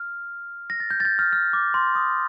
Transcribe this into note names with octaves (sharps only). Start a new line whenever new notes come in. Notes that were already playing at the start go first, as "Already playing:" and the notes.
Already playing: F6
A#6
A6
G6
A6
G6
F6
F6
D6
C6
D#6